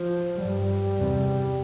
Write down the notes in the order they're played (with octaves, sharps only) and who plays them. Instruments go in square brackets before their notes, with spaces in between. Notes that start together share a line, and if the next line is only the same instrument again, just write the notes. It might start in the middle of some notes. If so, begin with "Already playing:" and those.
Already playing: [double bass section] F3
G2 G3
E2 C3